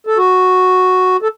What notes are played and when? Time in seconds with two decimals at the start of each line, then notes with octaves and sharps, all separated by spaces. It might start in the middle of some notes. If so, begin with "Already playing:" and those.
0.07 A4
0.17 F#4
1.22 A4